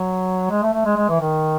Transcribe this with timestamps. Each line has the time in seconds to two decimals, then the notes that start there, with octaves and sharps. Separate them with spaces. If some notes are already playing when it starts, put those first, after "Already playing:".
Already playing: F#3
0.51 G#3
0.63 A3
0.74 A3
0.85 G#3
0.97 G#3
1.09 E3
1.20 D#3